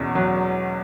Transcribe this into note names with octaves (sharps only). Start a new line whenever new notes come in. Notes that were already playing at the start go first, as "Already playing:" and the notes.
Already playing: E2 B2 C#4
F#3